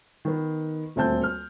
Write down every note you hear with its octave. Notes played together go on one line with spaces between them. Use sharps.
D#3 B3
D#1 D2 C4 A5 G6
F6